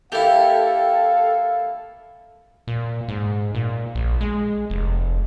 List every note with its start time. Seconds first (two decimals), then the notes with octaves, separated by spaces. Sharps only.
0.12 A#3 E4 G4 A4 F5
2.67 A#2
3.08 G#2
3.55 A#2
3.95 A#1
4.21 G#3
4.70 F1